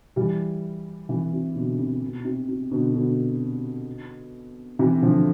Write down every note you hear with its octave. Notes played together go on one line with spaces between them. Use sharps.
E3 G3
C3 E3
C3
B2 D3
C3
B2
C3
C3
B2 D3
B2 D3
C3 E3
D3 F3